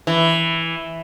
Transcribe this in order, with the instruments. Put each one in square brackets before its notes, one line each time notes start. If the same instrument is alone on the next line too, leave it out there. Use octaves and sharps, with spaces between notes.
[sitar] E3